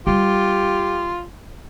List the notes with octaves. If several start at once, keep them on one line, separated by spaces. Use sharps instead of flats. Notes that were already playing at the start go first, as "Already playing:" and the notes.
G3 F4 G4